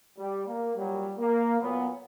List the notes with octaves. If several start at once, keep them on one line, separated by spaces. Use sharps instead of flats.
G3
A#3
A#2 F#3 G3
A#3
A#2 F#3 B3